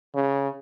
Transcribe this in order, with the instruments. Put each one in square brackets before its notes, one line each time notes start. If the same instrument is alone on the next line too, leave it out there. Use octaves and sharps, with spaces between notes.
[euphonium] C#3